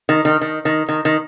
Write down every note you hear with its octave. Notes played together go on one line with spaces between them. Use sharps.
D#3
D#3
D#3
D#3
D#3
D#3